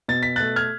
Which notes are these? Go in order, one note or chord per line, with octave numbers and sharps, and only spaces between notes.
B2 A6
B6
A3 F#6 A6
F6 G#6